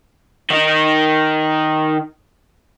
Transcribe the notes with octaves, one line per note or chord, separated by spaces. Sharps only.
D#3 D#4